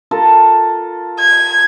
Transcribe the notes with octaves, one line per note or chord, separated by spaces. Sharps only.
F4 A4 A#4
G#6